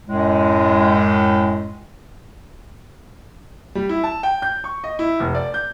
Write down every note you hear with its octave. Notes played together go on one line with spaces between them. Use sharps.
F#2 A2 G#3
G3
E4
A5
G5
G6
C#6
D#5
E4
F1
D5
G6